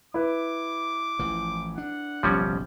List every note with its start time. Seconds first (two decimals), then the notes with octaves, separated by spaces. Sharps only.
0.14 E4 B4 D6
1.19 A1 E3 F3
1.78 D4 F#5
2.23 F#1 B1 F3 G3 C#4